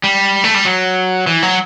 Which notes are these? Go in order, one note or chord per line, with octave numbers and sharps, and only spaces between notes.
G3
A3
G3
F#3
E3
F#3